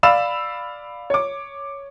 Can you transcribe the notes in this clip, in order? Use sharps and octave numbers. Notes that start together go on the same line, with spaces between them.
D5 F5 B5 E6 E7
C#5 D6